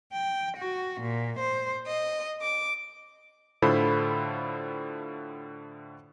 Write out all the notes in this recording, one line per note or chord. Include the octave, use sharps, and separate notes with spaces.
G5
F#4
A#2
C5
D#5
D6
A2 D3 F4 A4 C5 B5